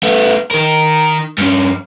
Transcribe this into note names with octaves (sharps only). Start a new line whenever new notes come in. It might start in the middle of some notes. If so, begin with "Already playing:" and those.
A3 B3
D#3 A#4
G2 C#4